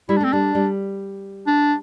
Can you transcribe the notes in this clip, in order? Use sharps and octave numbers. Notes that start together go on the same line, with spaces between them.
G3 E4
D4
A3 C4
G3 D4
G3
D4